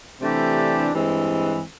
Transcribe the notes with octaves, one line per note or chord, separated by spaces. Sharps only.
C3 E3 A3 D4 G4
G2 E3 G#3 C4